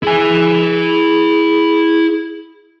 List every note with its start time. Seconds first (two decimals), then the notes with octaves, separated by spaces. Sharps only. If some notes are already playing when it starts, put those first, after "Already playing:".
0.03 E4 G#4 G#5